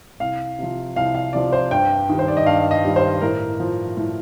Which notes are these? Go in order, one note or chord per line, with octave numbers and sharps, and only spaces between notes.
C2 F5
C3 F3
C2 F5
F5
C3 F3 D5
C5
G2 G5
D#3 G3
C5
D5
D#5
G2 F5
D#5
D#3 G3
C5
A2 A#4
F3
A2